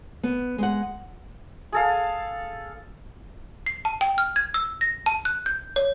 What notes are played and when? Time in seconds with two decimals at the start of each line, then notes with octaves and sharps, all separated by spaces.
0.23 B3
0.58 G#3 F#5
1.72 G#4 A4 F5
3.66 C7
3.85 A5
4.01 G5
4.18 F6
4.36 G#6
4.54 E6
4.81 A#6
5.06 A5
5.25 F#6
5.46 G6
5.76 C#5